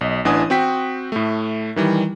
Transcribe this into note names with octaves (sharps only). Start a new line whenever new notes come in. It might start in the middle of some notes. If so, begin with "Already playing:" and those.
B1 D#5
A1 E3 D4 F#5 G#5 D#6
C4 F#4 G5 B6
A2 A3
D#3 E3 G3